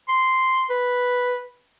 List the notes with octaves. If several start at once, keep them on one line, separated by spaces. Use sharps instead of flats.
C6
B4